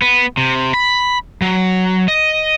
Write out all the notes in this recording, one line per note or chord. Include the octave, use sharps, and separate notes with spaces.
B3
C3
B5
F#3
D#5